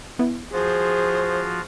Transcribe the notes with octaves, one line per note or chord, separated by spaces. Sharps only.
B3 E4
F3 F4 F#4 G#4 C5